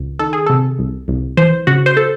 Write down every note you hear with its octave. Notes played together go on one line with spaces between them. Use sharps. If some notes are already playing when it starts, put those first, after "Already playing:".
Already playing: C#2
D#3 A4
G#4
C3 A4
C2
C2
E3 C5
C#3 F#4
C5
A4